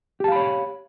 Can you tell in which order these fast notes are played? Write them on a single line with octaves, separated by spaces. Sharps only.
G4 A5 F5 B5 C#5